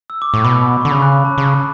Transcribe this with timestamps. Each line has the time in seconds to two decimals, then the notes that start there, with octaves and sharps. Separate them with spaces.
0.10 E6
0.22 D6
0.33 A2 C#6
0.44 B2 B5
0.81 D3 C#6
0.91 C#3 B5
1.02 F#6
1.14 B5
1.25 A5
1.38 C#3